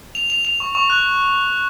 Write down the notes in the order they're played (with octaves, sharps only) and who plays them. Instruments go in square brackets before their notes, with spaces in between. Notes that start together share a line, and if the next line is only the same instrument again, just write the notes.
[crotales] F7
F7
F7
C#6
C#6
F#6